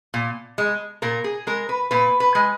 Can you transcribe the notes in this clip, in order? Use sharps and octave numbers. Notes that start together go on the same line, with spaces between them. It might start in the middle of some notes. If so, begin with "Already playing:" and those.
A#2
G#3
A#2 A#4
G#4
G#3 A#4
B4
A#2 B4
B4
G#3